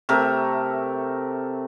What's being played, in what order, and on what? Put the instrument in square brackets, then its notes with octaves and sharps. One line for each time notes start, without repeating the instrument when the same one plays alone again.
[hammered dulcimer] C3 A3 A#4 E5